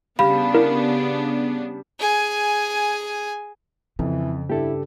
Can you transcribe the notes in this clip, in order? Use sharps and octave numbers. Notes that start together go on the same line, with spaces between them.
C#3 G3 B3 D4 F5 B5
E4 A#4
G#4 G#5
F2 C#3 E3
G2 E4 G4 A4